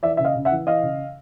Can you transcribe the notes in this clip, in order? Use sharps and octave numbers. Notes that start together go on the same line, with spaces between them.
E3 D5 E5
C#3 E5
D#5 F5
C#3
E5 F#5
E3
E3 D#5 F5
C#3